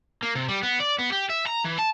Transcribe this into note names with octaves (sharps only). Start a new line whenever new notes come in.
A#3
C3
G3
B3
D5
B3
G4
E5
A#5
E3
A5